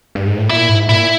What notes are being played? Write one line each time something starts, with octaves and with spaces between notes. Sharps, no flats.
G2
G#2
A2
A#2 E4
G#2
A#2 E4